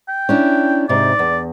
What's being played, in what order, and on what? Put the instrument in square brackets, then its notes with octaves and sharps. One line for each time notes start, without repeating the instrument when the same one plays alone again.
[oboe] G5
[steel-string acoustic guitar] C#4 D4 E4
[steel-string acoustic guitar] G#2 C3 [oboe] D5
[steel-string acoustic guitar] E2